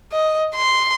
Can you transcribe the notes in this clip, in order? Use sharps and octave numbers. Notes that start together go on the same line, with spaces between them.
D#5
C6